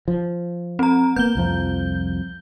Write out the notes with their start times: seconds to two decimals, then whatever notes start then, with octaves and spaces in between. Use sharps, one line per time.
0.08 F3
0.79 C4 A#5
1.16 A#3 B3 G6 G7
1.35 C2 F2 F3